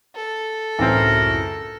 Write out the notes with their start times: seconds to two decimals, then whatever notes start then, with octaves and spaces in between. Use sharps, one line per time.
0.16 A4
0.79 C#2 F#2 A2 E3 C4 A#4